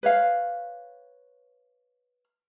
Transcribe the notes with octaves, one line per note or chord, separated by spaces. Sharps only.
B4 C#5 F5